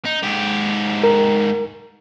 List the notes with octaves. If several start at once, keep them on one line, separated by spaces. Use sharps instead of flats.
D#4
G#2 G4
A#4